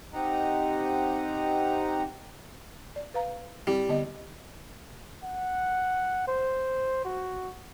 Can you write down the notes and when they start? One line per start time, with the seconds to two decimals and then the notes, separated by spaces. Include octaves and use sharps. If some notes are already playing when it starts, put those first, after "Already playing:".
0.14 C4 D#4 G4 D#5 F#5 A#5
2.96 D5
3.14 B4 F5 A#5
3.67 G3 C4 E4
3.89 D3 B3 D#5
5.24 F#5
6.27 C5
7.05 F#4